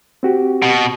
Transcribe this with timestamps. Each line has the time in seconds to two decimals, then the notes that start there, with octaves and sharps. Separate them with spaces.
0.23 C4 F#4 G4
0.62 B2